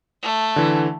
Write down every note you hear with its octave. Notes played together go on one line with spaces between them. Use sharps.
A3
D3 E3